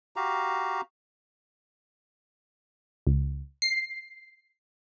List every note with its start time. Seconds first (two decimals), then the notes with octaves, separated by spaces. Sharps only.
0.16 F#4 G4 F5 A#5
3.07 C#2
3.62 C7